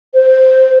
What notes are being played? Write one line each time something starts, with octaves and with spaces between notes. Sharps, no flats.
C5